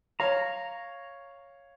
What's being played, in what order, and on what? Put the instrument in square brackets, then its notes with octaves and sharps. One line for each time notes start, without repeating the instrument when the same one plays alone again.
[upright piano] C#5 F5 [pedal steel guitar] A#5